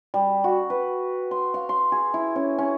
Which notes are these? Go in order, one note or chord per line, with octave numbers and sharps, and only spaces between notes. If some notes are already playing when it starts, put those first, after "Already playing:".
G3
F#4
B4
C6
F5
C6
G#4
E4
C#4
C#4